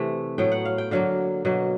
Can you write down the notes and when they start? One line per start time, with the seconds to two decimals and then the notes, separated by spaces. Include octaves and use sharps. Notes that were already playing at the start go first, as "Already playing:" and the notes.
Already playing: C3 E3 A3
0.38 A2 F#3 B3 G5
0.52 F#5
0.65 F5
0.78 G5
0.91 D3 F#3 A#3 F5
1.45 B2 F#3 A#3